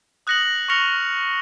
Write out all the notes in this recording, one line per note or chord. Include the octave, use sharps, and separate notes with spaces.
D#6 F#6 A#6 C#7 F#7
C#6 F6 A#6 C#7 F7